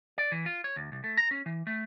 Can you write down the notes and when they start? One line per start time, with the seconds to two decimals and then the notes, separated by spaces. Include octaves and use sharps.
0.18 D5
0.32 E3
0.46 F4
0.64 C#5
0.76 D2
0.92 C2
1.04 A3
1.17 A#5
1.31 C#4
1.46 E3
1.67 A3